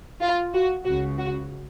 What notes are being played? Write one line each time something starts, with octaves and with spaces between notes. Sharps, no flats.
F4
F#4
C#2 C#3 F#4
F#4